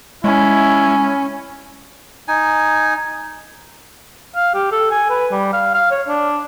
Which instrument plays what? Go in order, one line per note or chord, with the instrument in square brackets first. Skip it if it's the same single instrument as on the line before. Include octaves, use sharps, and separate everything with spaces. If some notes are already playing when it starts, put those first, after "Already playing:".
[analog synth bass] G#3 [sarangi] C#4 [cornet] E4
[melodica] D#4 G#5
[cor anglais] F5
G4
A4
G#5
B4
G3
F5
F5
C#5
D4